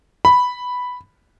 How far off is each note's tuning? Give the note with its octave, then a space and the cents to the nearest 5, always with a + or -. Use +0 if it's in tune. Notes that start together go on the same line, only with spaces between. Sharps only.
B5 +0